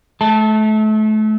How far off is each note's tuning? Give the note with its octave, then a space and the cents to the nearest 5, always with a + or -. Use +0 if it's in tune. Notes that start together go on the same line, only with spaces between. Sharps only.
A3 -30 A5 +0